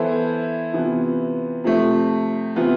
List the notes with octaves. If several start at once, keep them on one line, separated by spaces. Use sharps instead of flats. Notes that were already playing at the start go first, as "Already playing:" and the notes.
Already playing: E3 B3 E4 A4 C5
C3 E3 B3 F4
C3 F3 A3
C3 E3 B3 F4